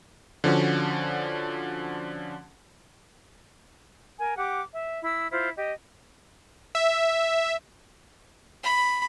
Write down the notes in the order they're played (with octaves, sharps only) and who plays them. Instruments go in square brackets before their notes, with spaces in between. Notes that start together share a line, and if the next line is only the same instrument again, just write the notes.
[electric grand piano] D3 F3 C#4 F#4
[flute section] A#4 G#5
G4 F#5 D6
E5
E4 E6
E4 F4 C5
G4 D#5
[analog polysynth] E5
[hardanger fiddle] B5